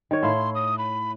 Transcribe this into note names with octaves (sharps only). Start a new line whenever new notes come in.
D#3 C#5
A2 E4 F5 C6
D#6
B5